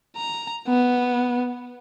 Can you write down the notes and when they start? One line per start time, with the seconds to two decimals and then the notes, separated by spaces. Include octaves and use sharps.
0.17 A#5
0.67 B3